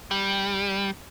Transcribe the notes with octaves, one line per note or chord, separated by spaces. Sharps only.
G3